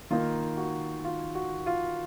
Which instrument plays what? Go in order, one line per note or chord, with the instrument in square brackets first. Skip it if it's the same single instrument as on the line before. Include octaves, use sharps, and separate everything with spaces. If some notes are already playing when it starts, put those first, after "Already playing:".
[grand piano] D#3 A#3 D#4 F4
F#4
F4
F#4
F4